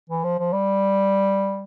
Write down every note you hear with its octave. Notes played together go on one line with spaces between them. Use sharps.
E3
F3
F3
G3